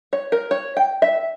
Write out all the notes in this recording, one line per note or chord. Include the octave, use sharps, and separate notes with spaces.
C#5
A#4
C#5
G5
E5